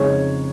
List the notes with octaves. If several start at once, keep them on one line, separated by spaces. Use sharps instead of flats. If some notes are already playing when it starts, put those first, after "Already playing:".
Already playing: F2 C#3 G#3 D#4 C#5